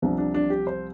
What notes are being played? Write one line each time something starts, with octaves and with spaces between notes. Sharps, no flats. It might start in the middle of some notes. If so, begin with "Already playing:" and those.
C2 C3 F3 D4
D4
D4
G4
C5